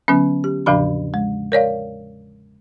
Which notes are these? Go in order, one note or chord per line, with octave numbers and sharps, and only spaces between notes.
D3 F#3 B3 C#4
G4
E2 A2 C#3 F3 D4 B5
G#3
A#4 C#5 D5 F5